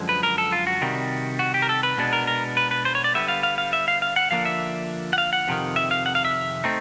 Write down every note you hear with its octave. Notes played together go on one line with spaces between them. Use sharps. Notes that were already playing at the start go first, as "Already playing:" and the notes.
Already playing: F#2 D3 F3 G#3
B4
A#4
A4
F4
F#4
C3 D#3 G3
F#4
G4
A#4
A4
B4
B2 G#3 B3 D4
A#4
A#4
B4
B4
C5
C#5
D5
D3 G3 B3 E5
F5
F5
F5
E5
F5
F5
F#5
D3 F3 A#3 D4 F5
E5
F#5
F5
F#5
F2 C3 D#3
E5
F5
F#5
F5
E5
A3 C4 D#4